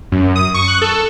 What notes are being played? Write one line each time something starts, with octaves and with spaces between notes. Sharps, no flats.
F#2
D#6
C#6
F#6
A4